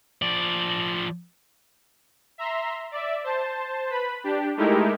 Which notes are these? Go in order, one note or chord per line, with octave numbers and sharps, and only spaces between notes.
F3 D5
E5 A#5 C6
D5 E5
C5 A5
B4 B5
D4 G4
G#3 A3 D#4 E4 G4 A#4